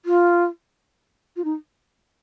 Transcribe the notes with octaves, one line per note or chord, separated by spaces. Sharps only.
F4
F4
D#4